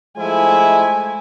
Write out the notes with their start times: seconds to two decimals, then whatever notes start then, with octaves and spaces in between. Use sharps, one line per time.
0.17 F3 G#3 A3 E4 G#5